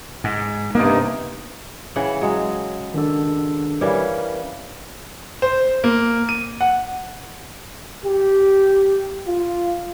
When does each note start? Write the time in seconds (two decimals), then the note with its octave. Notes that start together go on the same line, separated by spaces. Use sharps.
0.24 G#2
0.75 G2 C3 A#3 B3 D#4
1.96 C#3 E3 F#5
2.21 F#3 G#3
2.94 D#3 D4 A4
3.81 E3 G3 C#4 A#4 B4 F5
5.42 C5
5.84 A#3
6.29 D#7
6.61 F#5
8.05 G4
9.27 F4